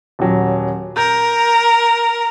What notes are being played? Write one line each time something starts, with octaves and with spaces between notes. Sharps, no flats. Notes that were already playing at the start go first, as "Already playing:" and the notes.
D#1 F#3
A#4 G6